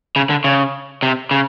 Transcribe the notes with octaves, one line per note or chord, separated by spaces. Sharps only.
C#3
D3
C#3
C3
C#3